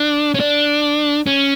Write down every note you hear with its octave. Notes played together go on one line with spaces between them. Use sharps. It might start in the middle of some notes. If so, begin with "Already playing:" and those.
Already playing: D4
C#4
D4
C#4